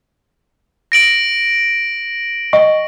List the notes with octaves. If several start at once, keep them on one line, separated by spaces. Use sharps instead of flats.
A#6 D7 F#7
D#5 G5 C#6